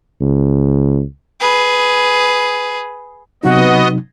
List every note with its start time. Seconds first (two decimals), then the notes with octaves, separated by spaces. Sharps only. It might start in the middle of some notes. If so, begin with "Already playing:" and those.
0.21 C#2
1.41 G#4 B4
3.44 C3 F#3 B3 D#4 F#4 D#5